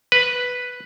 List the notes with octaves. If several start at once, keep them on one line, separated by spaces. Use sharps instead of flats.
B4